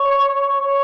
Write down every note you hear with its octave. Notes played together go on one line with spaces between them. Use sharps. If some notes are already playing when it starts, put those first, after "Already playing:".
Already playing: C#5
C#5